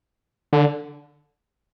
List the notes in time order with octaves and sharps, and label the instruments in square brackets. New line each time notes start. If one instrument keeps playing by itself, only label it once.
[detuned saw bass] D3